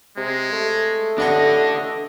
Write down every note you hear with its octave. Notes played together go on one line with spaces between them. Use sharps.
C3 G#3
A3
A1 B3 D4 A4 C#5 D#5